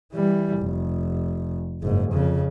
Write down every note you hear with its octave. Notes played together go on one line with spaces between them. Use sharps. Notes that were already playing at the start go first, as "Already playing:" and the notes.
E3 G3
F1
F#1 G#2
F2 C#3